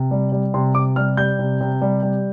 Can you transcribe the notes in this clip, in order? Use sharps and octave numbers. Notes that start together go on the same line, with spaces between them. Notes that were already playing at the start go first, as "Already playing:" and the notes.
Already playing: C3
G3
G3
C3 C6
C3 D6
G3 F6
G3 G6
C3
C3
G3
G3